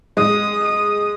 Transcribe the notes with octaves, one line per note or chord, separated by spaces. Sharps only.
G#3 D#6
D#6